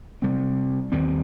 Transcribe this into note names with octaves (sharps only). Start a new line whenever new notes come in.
C3 G3 C4
D#2 D#3 G3 C4